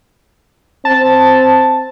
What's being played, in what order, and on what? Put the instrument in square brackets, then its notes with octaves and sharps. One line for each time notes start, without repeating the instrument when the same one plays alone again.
[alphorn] C4 [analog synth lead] A5